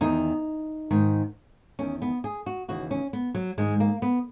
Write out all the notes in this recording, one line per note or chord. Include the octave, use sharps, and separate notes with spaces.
E2 D#3 D#4
G#2 D#3
E2 D#3 C#4
B3
G#4
F#4
D#2 C#3 E3 F#4
C#4
B3
F#3
G#2 D#3 G#3
A#3
B3